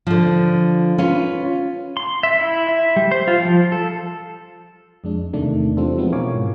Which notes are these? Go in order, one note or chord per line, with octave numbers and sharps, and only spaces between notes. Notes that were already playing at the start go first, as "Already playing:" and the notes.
D3 F3
C#4 F4 B4
C6
E5
E4
E5
G3
C5
F4
F3
A4
F2 G#3 D4
E2 C3 D#3 A3 D4
E3 G3 C4 D4 F4 A4
F3 G#3 B3 C4 E4
B2 A#4 C#5 F5 G#5 D6
G#2